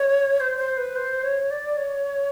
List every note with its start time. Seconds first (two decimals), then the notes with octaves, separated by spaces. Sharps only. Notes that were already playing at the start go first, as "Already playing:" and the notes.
Already playing: C#5
0.40 C5
0.58 C5
0.77 B4
0.96 C5
1.23 C#5
1.51 D5
1.77 C#5